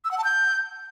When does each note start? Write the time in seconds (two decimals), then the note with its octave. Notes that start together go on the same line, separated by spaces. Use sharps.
0.05 E6
0.11 F#5
0.18 A5
0.24 G6